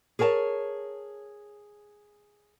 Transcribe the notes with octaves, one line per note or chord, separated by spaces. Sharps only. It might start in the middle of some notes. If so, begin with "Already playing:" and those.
G#4 A#4 C#5 G#5 A5